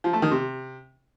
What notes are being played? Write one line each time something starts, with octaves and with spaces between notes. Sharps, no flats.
F3
A3
D#3
C3